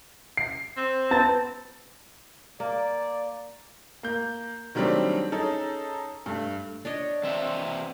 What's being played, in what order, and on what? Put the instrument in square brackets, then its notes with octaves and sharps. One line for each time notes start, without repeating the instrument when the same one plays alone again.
[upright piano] C7
[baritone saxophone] C4
[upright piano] B3 A5 A6
[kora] A#3 [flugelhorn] D5
[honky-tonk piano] A#3 G6
D#3 F#3 G3 A3 C4 D4
C#4 D#4 G#4 A4
G2 A3
[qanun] D4 C#5 D#5
[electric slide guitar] E3 C4 E5